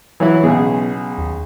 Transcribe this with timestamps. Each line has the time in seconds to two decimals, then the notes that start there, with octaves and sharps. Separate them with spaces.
0.20 E3 F#3 E4
0.44 B1 C#3 B3 G#4
1.18 D#2